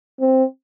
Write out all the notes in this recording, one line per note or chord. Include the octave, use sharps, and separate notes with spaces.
C4